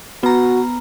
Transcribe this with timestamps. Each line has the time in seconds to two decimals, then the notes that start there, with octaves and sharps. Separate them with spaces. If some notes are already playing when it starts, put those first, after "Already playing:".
0.23 B3 F#4 A#5